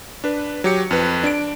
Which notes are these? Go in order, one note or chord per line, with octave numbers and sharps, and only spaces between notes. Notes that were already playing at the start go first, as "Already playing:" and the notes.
D4 B4
F#3 G4 C#7
F2 B4
D4 D7